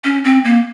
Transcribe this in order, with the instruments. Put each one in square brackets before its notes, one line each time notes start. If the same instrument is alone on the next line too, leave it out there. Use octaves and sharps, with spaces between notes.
[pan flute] C#4
C4
A#3